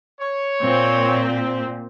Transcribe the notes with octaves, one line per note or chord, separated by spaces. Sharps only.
C#5
A#2 C4